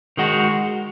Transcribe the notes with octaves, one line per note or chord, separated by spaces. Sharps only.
D#3 G#3 D#4 F#4